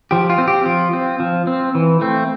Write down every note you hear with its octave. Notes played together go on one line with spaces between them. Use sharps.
F3 G4
F4
C4
G4
F3 F4
C4
F3
C4
E3
A3 C4